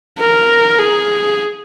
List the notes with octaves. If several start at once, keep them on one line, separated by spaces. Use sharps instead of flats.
A#4
G#4